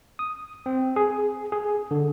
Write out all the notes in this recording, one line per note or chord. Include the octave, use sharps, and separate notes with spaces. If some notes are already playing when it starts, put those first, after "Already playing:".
D#6
C4
G#4
G#4
D3